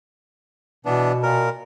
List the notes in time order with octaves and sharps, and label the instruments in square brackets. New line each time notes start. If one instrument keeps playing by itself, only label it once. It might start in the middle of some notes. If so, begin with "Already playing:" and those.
[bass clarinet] B2 [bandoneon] E3 B3 D4
[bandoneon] A#2 A#4